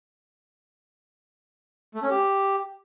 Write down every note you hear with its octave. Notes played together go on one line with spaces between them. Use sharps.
A3
C#4
G4